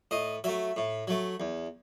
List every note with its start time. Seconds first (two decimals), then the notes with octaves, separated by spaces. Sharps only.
0.11 A2 D#5
0.44 F#3 A3 E5
0.76 A2
1.08 F#3 A3
1.40 E2